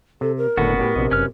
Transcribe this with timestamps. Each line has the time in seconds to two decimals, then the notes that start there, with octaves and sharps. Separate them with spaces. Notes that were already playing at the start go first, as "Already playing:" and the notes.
0.21 C3 A4
0.37 A#4
0.57 F#1 A2 D3 B3 F#4
0.79 A2 G4
0.96 A#1 C3 D#5
1.11 F#1 C#4 B4 F6